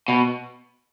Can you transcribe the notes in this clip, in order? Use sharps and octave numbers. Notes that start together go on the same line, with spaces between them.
B2